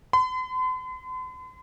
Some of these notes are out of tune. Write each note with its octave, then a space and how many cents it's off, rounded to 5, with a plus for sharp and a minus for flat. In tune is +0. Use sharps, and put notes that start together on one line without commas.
C6 -45